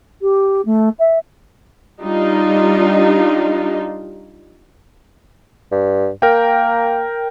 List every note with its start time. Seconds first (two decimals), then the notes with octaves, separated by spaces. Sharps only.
0.22 G4
0.66 A3
0.99 E5
2.02 G3 D4 D#4 F4
5.72 G2
6.22 A#3 A#4 G5